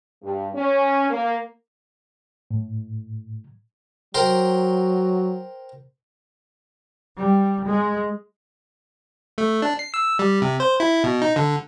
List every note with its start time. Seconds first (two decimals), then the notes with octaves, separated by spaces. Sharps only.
0.22 G2
0.55 C#4
1.10 A#3
2.51 A2
4.14 F#3 A#4 C5 G5
7.18 G3
7.67 G#3
9.38 A3
9.62 D4
9.79 C7
9.94 E6
10.19 G3
10.42 C3
10.60 C5
10.80 E4
11.04 B2
11.22 D#4
11.36 D3